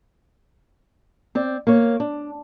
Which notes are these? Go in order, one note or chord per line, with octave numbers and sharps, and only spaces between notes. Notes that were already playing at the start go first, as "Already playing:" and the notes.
C4 D5
A#3 C#5
D4